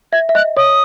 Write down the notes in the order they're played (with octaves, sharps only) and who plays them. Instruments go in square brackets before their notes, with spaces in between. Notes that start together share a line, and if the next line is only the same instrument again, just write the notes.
[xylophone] E5 [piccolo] G#6
[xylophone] E5
[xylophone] D#5 [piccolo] F#6
[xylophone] C#5 [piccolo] D#6